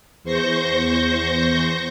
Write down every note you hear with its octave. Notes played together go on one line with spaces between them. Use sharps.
E2 C5 C#6 G6 A#6